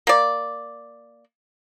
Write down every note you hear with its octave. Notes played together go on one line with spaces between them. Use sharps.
A#3 D5